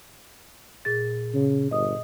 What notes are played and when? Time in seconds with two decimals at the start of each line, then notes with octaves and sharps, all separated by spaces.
0.85 A#2 G#4 A6
1.35 C#3
1.71 G1 D#5 D#6